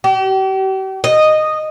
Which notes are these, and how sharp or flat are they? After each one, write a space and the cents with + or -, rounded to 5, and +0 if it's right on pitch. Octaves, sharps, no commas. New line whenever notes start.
G4 -40
D#5 -10